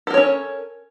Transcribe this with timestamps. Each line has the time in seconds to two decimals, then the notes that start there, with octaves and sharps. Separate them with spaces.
0.07 A4
0.10 A#4
0.14 C#5
0.17 C#4